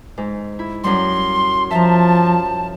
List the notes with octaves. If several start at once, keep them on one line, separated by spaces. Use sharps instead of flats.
G#2
E4
F#2 G3 C6
F3 E5 A5 A#5